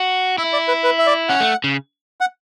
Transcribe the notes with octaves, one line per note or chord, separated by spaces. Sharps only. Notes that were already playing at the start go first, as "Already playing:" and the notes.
Already playing: F#4
E4 E5
D5
B4
B4
E5
D5
C#4 F#5
A3
C#3
F#5